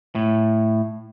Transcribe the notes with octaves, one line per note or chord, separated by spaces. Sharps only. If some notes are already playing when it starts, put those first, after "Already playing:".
A2